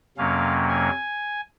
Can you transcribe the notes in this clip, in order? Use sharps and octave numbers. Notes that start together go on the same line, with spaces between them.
F2 C3 F#3 A#3 C#4 F5
G#5